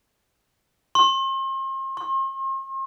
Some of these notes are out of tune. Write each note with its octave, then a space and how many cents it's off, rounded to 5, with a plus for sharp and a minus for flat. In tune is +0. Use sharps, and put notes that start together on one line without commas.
C6 +40
C6 +45